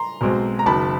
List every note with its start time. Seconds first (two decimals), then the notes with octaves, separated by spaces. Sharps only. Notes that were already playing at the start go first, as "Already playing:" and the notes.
Already playing: A#5 C6
0.21 B1 B2 G#3 C4
0.59 A#5
0.66 F#1 F#2 D#3 A5 B5